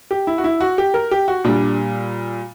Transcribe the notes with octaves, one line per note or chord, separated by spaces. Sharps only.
G4
E4
F#4
E4
F#4
G4
A#4
G4
F#4
A#2 G3 D4